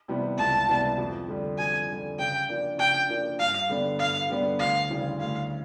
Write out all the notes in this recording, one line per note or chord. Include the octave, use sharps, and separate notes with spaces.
C3 E3 G3 B3
C#2 A5
C3 E3 G3 B3
F2
D3 G3
F2 G#5
D3 G3
C#3 G5
F3 A#3 D4
C#3 G5
F3 A#3 D4
G2 F5
D3 G3 B3 D4
G2 F5
D3 G3 B3 D4
D2 F5
C#3 E3 G3
D2 F5